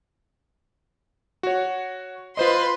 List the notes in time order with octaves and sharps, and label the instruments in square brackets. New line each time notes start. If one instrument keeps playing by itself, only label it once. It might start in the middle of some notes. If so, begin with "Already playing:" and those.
[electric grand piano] F#4 C#5
[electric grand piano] F4 C5 D#5 [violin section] B4 C6